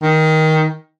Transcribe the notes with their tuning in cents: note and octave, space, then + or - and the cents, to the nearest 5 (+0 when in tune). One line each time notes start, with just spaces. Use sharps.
D#3 +15